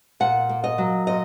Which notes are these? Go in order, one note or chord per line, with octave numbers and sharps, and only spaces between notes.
A#2 F#5
A#3
D#5
F#3
A#2 D#5